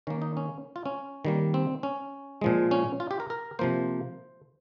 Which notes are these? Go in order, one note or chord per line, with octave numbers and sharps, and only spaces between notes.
D#3 A#3 C#4
D#4
C#4
F4
C#4
D#3 G3 A#3
C4
C#4
A#2 F3 G#3
C#4
F4
G4
A#4
A#4
C3 F3 A#3 C5